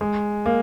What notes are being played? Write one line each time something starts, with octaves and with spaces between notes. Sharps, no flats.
G#3
A#3